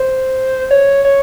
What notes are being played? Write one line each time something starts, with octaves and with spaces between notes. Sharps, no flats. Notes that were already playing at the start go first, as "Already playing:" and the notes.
Already playing: C5
C#5
C#5